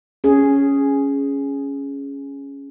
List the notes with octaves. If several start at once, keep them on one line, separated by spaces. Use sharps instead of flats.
C#4 G#4